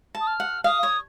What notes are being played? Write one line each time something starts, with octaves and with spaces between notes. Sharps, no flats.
A5
D#6
F6
F#5
F5 D#6
C#5